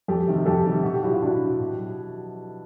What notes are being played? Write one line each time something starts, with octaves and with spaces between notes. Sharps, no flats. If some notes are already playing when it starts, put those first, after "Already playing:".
F2 G4 A4
C3 D#3 G3
F2 G4 A4
C3 D#3 G3
B2 F#4
G4
F#3 E4 F#4
F4
B2 D4 E4
F#3
B2
F#3